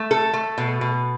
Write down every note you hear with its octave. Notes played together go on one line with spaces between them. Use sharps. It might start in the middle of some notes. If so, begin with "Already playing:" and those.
Already playing: A3
A4
A3
B2
B2